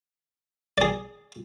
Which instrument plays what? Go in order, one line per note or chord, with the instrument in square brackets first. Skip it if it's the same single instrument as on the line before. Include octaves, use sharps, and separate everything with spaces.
[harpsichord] G#4 D5